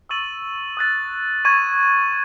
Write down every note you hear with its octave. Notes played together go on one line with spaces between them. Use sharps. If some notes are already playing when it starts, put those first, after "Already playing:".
C#6 E6 A6 D#7 F#7
D#6 F#6 A6
C#6 G#6 D#7